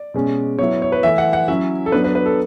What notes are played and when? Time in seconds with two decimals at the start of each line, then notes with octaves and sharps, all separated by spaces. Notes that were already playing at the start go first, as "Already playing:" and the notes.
Already playing: D5
0.14 B2 G#3 C#4
0.59 F#3 B3 E4 C#5
0.82 C#5
0.92 B4
1.03 E3 A3 E4 E5
1.18 F#5
1.33 F#5
1.48 F#3 C#4 E4 E5
1.86 A4
1.92 F#3 B3 D4 B4
2.04 B4
2.15 B4
2.26 A4